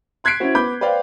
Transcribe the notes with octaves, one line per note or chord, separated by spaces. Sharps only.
C6 F#6 G#6 B6 C7 D7
C#4 E4 F#4 C5
B3 B5 D6 G6
B4 C5 D5 F5 G5